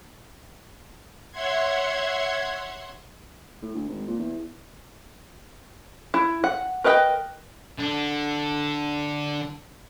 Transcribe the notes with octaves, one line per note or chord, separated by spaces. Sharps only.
C#5 E5 F#5 C6 G#6
A2
D2
G#1
A#2
E2
E4
F#5
A#4 B4 D#5 F#5 G5
D3 D4